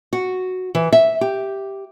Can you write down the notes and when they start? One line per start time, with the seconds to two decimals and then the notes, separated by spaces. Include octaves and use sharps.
0.13 F#4
0.75 E3
0.92 E5
1.21 G4